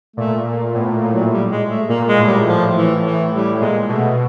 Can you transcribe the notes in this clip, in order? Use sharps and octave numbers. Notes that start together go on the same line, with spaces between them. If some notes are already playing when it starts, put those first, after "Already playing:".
A#2 A3
A#3
A2 B3
A#3
A#2
F#3
G3
G#3
A3
A#2 A#3
G#3
A2
G3
F3
E3
E3
G3
A#2 G#3
B2 A3